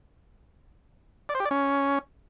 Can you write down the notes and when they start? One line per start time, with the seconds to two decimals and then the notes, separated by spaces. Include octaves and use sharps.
1.29 D5
1.35 C5
1.40 G4
1.45 D5
1.51 C#4